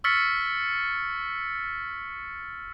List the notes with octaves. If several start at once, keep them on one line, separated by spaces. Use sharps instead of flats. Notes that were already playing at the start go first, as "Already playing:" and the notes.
C#6 E6 F6 A6 B6 C#7